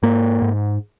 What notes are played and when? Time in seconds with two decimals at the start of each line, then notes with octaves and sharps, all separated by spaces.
0.03 G#2 A#3
0.42 G#2